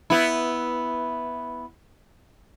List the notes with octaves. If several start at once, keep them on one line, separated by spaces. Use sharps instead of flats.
B3 E4